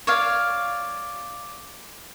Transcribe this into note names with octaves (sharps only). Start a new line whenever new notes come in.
C#5 D5 F5